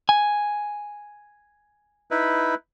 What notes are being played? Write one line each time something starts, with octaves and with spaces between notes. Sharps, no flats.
G#5
D#4 E4 B4